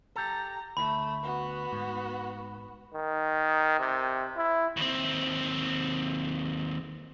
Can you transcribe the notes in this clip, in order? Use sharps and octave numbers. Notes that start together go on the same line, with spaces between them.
G4 A4 A#5
D2 A3 B5
B3 F#4
G#2
D#3
C3
E4
D#2 C4